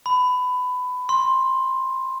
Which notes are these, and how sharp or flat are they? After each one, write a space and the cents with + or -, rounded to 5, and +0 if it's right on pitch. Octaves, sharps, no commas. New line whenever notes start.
B5 +20
C6 +15